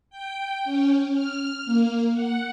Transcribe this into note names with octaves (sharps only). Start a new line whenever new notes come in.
G5
C#4
F6
A#3
F#5